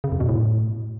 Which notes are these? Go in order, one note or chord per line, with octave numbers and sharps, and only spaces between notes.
C#3
F2
B2
A2